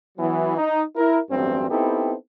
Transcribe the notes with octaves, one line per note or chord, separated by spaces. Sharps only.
E3 F#3 B3
D#4
E4 A#4
A1 E2 G2 F#3 C4
B3 C4 D#4 E4 G4 A4